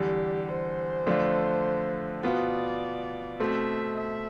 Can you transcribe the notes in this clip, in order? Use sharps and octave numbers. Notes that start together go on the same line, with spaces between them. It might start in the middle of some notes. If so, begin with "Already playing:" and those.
Already playing: E2 D3 G3 G4
C5
F2 D3 A3 D4 F4
B2 B3 F4 D5
B2 A3 C4 E5
E5